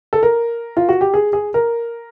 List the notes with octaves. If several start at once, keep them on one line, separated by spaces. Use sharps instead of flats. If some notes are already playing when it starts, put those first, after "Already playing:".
A4
A#4
F4
F#4
G4
G#4
G#4
A#4